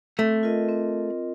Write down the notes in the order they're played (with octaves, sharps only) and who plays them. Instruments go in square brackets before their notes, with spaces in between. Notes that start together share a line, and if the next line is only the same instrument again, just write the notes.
[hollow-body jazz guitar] A3 [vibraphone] C4
[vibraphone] F4 A#4 D#5
C4